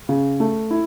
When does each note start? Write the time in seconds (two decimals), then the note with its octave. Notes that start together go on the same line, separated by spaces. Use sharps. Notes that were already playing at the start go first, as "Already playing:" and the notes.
0.09 C#3
0.40 A3
0.70 E4